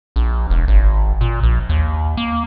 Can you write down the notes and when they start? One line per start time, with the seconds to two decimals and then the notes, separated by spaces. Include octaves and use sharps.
0.16 A#1
0.50 E1
0.68 G#1
1.21 A#2
1.43 A#1
1.69 D#2
2.17 A#3